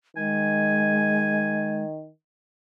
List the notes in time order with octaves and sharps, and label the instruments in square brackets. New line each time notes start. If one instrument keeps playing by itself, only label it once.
[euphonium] D#3 [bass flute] G#3 [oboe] G#5